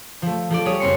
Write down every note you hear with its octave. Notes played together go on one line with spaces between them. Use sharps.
F3 A3
F3 A4 D5
G3 G#4 C#5 D#6
F#1 A#3 C4 C6 C#7